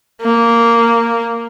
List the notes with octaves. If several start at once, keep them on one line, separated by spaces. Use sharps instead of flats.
A#3